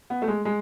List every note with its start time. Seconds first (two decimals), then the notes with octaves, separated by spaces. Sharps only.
0.10 B3
0.22 A3
0.28 G#3
0.45 G#3